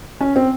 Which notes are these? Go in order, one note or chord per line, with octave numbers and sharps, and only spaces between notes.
C#4
C4